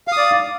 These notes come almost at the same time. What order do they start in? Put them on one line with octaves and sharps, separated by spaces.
F5 D#6 D5